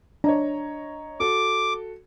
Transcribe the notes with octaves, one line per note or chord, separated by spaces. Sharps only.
D4 C#5 D#5 A#5
F#4 A4 D6